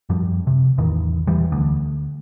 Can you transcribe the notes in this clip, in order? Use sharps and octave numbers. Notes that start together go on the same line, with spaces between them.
F#2 F3 G3
C3
A1 E2 D#3
E1 E3 G3
D2